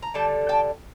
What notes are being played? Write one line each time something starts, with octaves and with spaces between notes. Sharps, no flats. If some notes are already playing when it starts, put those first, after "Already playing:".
A#5
D3 G3 G5 A5
G5 A5